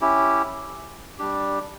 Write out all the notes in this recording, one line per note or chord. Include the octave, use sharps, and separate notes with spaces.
C#4 E4 G4
G3 D4 G4